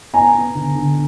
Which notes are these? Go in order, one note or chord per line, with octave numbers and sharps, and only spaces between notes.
B3 G#5 A#5
B3
D3
D3